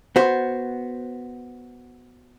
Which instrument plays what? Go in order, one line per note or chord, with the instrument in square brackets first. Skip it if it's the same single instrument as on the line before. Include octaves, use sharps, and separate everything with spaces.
[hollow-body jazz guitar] B3 F#4 C5